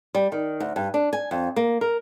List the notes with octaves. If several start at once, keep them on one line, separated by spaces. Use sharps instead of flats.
G3
D#3
D2
G2
D4
G#5
F2
A#3
A#4